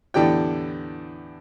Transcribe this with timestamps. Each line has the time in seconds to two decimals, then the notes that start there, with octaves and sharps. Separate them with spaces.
0.14 E2 A2 D3 G4 D5 G5